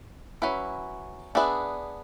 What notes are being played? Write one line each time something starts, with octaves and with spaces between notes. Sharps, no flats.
F#3 C#4 E4 B4
B3 D4 G#4 B4 E5